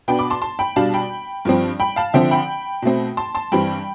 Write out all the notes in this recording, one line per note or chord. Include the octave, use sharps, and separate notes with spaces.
B2 B3 D4 G5 B5
B5 D6
A5 C6
A5 C6
G5 B5
B2 G3 D4 F5 A5
G5 B5
G2 F3 C4
G5 B5
F5 A5
D3 F3 C4 E5 G5
G5 B5
B2 A3 C4
A5 C6
A5 C6
G2 E3 G3 C4 G5 B5